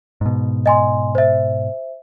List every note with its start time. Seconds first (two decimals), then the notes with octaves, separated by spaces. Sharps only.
0.21 G#2 B2
0.66 D#5 G#5 C6
1.15 C5 E5